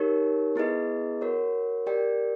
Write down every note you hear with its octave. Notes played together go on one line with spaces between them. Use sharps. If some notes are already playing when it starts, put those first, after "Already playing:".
Already playing: D#4 G4 A#4 C#5
B3 E4 G#4 B4 D#5
F#4 A#4 C#5
G4 A#4 D5 G5